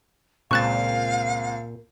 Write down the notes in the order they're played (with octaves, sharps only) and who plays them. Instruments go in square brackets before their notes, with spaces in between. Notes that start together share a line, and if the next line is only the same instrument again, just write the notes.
[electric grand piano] C#2 C4 E7 [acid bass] A#2 [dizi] F5 [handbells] C#6 F#6 A6